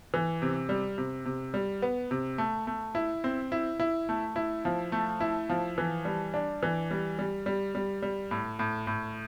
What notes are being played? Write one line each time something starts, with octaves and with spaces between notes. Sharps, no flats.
E3
C3
G3
C3
C3
G3
B3
C3
A3
A3
E4
C4
E4
E4
A3
E4
F3
A3
E4
F3
E3
G3
D4
E3
G3
G3
G3
G3
G3
A2
A2
A2